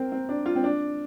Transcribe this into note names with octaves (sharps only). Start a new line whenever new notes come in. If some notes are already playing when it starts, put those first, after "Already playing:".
Already playing: C4 A#4 C5
C4
D4
F4
C4
D4